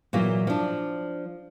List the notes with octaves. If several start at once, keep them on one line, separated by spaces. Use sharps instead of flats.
A#2 E3 F#3 A#3
F3 D4